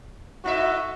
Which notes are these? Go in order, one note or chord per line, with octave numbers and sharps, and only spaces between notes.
A2 D#4 F#4 E5